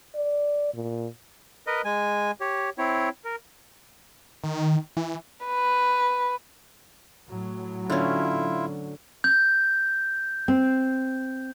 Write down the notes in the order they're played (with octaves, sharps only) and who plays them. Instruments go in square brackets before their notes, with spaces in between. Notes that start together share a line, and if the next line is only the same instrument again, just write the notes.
[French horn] D5
A#2
[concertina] A#4 B4 D#5
G#3 G#5
G4 C#5
C4 E4 C#5
A#4
[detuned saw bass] D#3
E3
[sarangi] B4
[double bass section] A2 F#3
[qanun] D3 C#4 [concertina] E4 F4
[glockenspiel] G6
[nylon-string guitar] C4